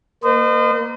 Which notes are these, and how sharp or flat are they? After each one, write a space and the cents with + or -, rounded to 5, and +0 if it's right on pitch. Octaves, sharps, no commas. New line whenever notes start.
A#3 +0 C5 -45 D#5 -30